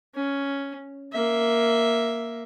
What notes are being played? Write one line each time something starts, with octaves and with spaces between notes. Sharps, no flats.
C#4
A#3 E5